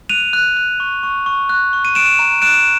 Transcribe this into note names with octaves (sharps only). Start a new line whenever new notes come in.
F#6 D#7 F7
F#6
F#6
C#6
C#6
C#6
F#6
C#6
D#7
F#6 D7 E7
A#5
F#6 D7 E7